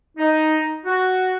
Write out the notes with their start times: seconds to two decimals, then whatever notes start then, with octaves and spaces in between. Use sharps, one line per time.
0.18 D#4
0.86 F#4